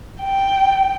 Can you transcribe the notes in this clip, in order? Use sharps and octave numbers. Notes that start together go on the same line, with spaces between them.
G5